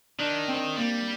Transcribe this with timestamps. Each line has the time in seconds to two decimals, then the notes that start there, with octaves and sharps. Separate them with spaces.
0.19 D#3 D4
0.48 C4
0.76 G3 A#3